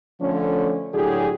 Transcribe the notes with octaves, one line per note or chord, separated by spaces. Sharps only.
D3 F3 A3 C#4
A2 D3 F#3 G4 G#4